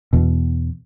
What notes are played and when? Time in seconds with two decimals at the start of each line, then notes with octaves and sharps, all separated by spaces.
0.13 E2 B2